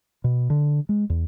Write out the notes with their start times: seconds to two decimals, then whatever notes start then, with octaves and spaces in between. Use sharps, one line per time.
0.24 B2
0.50 D3
0.89 G#3
1.10 E2